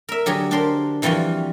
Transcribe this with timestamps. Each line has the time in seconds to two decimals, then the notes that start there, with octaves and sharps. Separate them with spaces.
0.09 A#4 E5
0.26 D3 F#3 G4 G#4
0.51 D4 G4 A#4 C5 C6
1.02 F2 E3 G3 F4 F#4 G#5